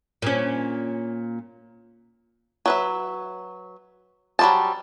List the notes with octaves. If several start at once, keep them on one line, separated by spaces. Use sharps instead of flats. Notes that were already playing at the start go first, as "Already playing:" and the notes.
A#2 C#4
F#3 B4 E5
F#3 G3 A#3 C5 A5